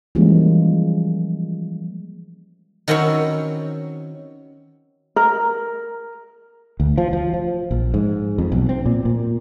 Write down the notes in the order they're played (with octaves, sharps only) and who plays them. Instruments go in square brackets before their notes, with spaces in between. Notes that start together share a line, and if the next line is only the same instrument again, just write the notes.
[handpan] E3 F3 G3 G#3 A#3 C#4
[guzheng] D#3 F#3 C4 C#4 E4 C#5
[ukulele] A#4
[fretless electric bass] D2
F3
F3
F3
A#1
G#2
F2
B1
C4
A#2
A#2